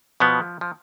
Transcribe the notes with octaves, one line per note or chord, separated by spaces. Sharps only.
B2 F3 B3
F3